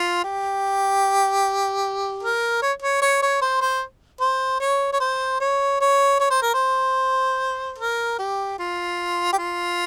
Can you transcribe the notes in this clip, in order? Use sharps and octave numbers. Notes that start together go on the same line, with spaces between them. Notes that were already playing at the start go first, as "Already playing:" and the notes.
Already playing: F4
G4
A#4
C#5
C#5
C#5
C#5
C5
C5
C5
C#5
C#5
C5
C#5
C#5
C#5
C5
A#4
C5
A#4
G4
F4
G4
F4